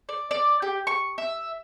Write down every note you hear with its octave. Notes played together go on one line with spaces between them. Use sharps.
D5
D5
G4
C#6
E5